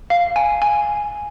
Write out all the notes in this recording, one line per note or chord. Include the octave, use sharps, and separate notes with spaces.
F5
G#5
G#5